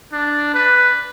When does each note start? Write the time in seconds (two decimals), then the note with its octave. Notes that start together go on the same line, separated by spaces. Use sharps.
0.13 D4
0.54 B4